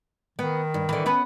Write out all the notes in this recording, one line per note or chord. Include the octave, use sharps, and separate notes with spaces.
D#3 B3
G2
D3 E3
B3 C#4 B4